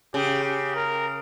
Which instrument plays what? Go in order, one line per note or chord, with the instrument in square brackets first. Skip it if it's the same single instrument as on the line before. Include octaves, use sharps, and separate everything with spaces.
[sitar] C#3 [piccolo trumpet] G4
[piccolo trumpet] G4
A#4